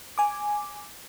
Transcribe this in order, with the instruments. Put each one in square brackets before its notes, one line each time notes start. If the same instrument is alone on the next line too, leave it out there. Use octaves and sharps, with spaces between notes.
[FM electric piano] G#5 D6